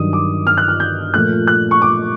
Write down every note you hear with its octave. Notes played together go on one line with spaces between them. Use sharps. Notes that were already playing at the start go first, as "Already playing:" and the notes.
Already playing: G2 D#3 F#3 D#6
D6
F6
F#6
F6
G6
A#2 F3 A3 F#6
F#6
C#6
D6